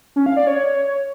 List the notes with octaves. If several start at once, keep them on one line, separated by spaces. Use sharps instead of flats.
C#4
F5
D5
C#5